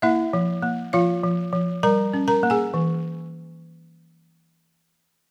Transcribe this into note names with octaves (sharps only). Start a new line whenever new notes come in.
A#3 E4 E5
F3
A#3
F3 F4 F5
F3
F3
G3 A#4 A#5
C#4
A#4 A#5
A#3
G#4 G#5
E3